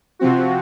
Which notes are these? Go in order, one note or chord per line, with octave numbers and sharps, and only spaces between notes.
C3 F3 C4 F#4